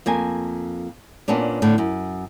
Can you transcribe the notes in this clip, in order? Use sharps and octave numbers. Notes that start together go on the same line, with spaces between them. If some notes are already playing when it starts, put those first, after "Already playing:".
F2 A#3 G#5
A#2 B3 C#4 D4
A2 D3
F#2